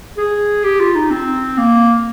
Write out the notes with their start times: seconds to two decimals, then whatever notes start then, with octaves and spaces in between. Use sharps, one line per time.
0.17 G#4
0.63 G4
0.80 F4
0.95 D#4
1.10 C4
1.57 A#3